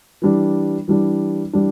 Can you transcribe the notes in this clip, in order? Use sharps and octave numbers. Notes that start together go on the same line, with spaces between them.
E3 G3 D4
E3 G3 D4
E3 G3 D4